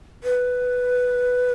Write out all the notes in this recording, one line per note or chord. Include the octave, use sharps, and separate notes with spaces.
B4